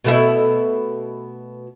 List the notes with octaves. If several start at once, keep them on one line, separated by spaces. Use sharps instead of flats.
B2 A3 E4